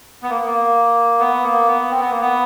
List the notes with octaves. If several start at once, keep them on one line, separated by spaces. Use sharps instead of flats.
B3
A#3
A#3
B3
A#3
B3
C4
B3
A#3
B3